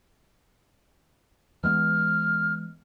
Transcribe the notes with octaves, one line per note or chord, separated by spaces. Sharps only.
E3 G#3 B3 F6